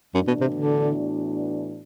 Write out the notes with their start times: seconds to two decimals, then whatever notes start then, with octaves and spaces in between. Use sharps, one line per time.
0.14 F#2 A2 E3 B3 D4 F#4
0.27 B2
0.41 C3
0.54 D3